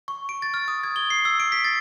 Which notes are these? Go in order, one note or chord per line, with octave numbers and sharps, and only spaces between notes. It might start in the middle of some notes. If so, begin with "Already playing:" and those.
C#6
D7
A6
F6
D#6
G#6
G7
C7
E6
D7
B6
A6